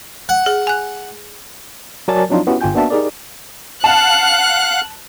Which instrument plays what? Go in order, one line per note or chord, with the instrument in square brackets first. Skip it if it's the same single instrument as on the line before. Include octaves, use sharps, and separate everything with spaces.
[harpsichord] F#5
[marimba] G#4
G#5 F#6
[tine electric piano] F#3 A#4 D5 G#5 A5 A6
F3 F#3 C4 D4 D#4 F4
B3 C#4 E4 F#4 G4
G1 F4 G5 G#5 G6
A#3 B3 D4 F#4 E5 A5
D#4 G4 G#4 A#4 D5
[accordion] F5 F#5 [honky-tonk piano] A5 [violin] F#6